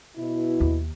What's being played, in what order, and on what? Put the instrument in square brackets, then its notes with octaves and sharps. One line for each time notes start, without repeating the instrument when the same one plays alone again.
[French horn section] B2 E4
[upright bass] D#2